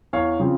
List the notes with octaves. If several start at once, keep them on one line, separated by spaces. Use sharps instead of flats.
E2 C#5 F5
C#3 F3 C4